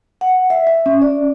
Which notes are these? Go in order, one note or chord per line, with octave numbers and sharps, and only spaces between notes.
F#5
E5
E5
C#4
D5